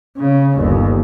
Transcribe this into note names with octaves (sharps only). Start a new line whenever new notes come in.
C#3
G1 D#2